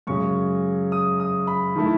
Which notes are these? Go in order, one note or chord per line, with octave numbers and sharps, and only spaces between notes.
F#2 C#3 G#3 C#6
D#6
D#6
B5
D#3 A3 E4